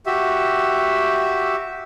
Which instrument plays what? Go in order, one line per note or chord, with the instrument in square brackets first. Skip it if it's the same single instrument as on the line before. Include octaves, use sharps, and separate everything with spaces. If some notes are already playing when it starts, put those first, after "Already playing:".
[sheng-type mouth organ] F#4 G4 E5